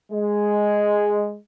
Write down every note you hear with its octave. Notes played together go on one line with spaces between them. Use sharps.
G#3